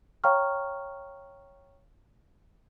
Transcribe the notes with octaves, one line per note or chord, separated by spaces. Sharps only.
C#5 F5 G5 A#5 C#6 F6